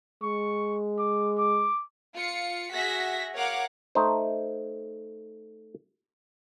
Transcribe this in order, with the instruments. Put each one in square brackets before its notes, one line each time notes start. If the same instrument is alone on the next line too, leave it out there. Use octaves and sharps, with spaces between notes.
[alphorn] G#3 [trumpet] C#6
[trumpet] D6
D6
[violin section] F4 C#7
F#4 G#4 E5 A#6 B6
A#4 C#5 F5 F#5 D6
[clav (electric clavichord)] A3 D#4 C5